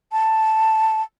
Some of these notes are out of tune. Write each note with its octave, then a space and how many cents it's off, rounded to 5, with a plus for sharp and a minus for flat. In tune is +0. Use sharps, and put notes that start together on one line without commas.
A5 +0